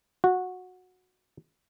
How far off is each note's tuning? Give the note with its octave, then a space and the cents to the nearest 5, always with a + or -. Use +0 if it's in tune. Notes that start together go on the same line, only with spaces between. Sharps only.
F#4 -15